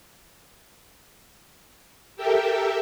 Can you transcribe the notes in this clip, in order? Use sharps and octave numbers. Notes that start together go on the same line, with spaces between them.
G4 A4 A#4 E5 G5